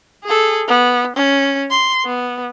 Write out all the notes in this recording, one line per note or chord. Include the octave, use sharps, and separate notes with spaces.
G#4 A4
B3
C#4
C6
B3